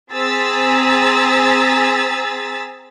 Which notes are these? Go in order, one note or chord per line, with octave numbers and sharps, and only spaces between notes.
C4 G#4 A#5 E6 A6 B6